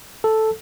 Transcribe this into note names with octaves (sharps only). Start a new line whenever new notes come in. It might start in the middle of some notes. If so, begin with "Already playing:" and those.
A4